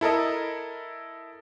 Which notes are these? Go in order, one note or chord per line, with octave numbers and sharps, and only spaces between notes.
E4 A4 A#4 D#5